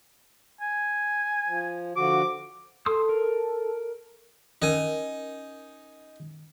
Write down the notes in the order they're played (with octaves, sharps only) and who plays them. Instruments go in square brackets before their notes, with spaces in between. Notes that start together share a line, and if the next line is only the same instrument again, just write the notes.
[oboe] G#5
[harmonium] F3
[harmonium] D3 F3 F#4 [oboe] D6
[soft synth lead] A4 [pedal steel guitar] C6 D#6 E6
[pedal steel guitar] A#4
[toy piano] C#4 A#4 [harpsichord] D#4 G#5